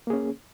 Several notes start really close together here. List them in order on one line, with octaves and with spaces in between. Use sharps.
A#3 G#4 C#4